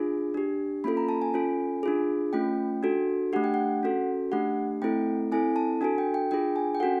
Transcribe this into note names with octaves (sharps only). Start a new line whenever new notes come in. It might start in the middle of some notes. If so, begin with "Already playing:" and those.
Already playing: D4 F4 G#4
D4 G4
A#3 C#4 F4 A4 B5
A#5
A5
G#5
C#4 F4 A4
D4 F4 G#4
A3 C#4 F4 G5
D4 F#4 A4
A3 D4 G4 F#5
G5
F#5
C#4 F#4 A4
A3 D4 G4 F#5
A3 C4 E4 A4 G5
C4 E4 A4 G#5
A5
D4 F#4 A4 G#5
G5
G5
D4 F4 G#4 G5
G#5
G5
C#4 F#4 A4 F#5